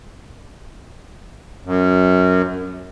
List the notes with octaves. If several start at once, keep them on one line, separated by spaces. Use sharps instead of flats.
F#2